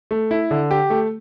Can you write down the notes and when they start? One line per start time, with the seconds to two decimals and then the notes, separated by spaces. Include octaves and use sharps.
0.11 A3
0.31 E4
0.51 D3
0.71 G4
0.90 A3